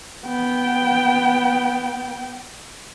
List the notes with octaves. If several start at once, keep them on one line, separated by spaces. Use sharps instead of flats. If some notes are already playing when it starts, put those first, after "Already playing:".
B3 G5